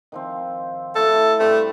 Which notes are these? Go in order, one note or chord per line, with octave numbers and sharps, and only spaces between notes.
D#3 F3 C4
A3 E4 F#4 A4
G2 G3 A3 C4